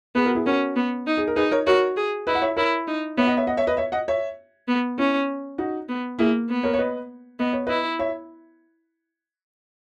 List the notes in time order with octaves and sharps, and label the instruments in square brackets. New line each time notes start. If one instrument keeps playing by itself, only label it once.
[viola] B3 [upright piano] G#4 B4
[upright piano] F#4 A#4
E4 G#4
[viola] C#4 [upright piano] F#4 A#4
[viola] B3
D#4
[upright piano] G#4
A#4
[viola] D#4 [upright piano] G#4 B4
[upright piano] A#4 C#5
[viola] F#4 [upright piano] A#4 C#5
[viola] G#4
[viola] E4 [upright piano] B4 D#5
[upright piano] F#5
C#5 E5
[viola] E4 [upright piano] A#4 C#5
[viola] D#4
[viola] B3 [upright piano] C#5 E5
[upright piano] D#5 F#5
C#5 E5
D#5 F#5
C#5 E5
B4 D#5
C#5 E5
D#5 F#5
C#5 E5
[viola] B3
[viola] C#4 [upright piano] E4
[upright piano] D#4 F#4
[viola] B3
[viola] A#3 [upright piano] E4 G#4
[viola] B3
[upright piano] A#4 C#5
C#5
B4 D#5
[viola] B3 [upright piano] D#5
[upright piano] C#5
[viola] E4 [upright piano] B4 D#5
[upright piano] C#5 E5